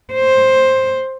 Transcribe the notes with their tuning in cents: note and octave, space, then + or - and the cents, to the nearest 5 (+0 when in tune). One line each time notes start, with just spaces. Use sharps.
C5 +10